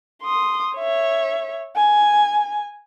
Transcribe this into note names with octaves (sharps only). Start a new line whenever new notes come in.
C6 D#6
C#5 E5
G#5